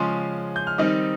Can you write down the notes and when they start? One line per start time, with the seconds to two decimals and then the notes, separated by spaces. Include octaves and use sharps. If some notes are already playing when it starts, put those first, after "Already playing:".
Already playing: C#3 F3 G#3 C#4 C6
0.56 G6
0.67 F6
0.78 D#3 G3 C4 D#4 D#6